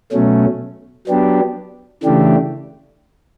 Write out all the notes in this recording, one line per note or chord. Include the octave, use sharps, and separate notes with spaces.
B2 F#3 A3 C#4
F#3 B3 D4 G4
C#3 E3 A3 D4 G4